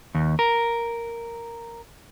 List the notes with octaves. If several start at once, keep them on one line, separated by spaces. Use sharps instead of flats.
D#2
A#4